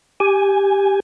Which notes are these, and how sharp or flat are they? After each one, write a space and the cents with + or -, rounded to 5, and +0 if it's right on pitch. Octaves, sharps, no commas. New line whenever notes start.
G4 +0 G#5 +0